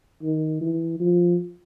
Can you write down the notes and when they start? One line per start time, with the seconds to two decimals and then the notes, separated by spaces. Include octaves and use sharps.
0.22 D#3
0.61 E3
1.00 F3